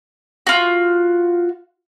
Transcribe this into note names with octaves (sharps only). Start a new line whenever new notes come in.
F4 F#4